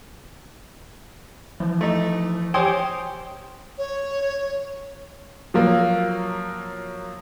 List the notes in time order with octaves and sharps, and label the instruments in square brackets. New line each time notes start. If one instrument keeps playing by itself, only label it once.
[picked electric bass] E3 F3
[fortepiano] A3 D#4
[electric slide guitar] G4 C#5 G5 [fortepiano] C5 G#5 D#6
[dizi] C#5
[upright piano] F3 F#3 A#3